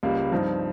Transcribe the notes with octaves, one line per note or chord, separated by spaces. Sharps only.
C#2 C#3 G3 A#3
G2 F3 C4 D#4